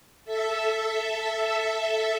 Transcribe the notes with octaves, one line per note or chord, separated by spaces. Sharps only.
A4 E5